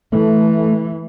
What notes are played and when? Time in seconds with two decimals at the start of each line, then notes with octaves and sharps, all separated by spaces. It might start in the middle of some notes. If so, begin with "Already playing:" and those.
0.12 E3 A3